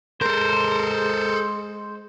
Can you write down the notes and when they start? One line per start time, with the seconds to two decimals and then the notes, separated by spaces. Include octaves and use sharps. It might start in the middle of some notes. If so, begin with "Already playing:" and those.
0.22 G#3 A4 A#4 C5